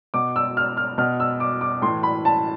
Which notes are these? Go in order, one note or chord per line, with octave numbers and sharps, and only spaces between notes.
B2 D6
E6
F6
F6
B2 F6
E6
D6
D6
A2 E3 C6
B5
A5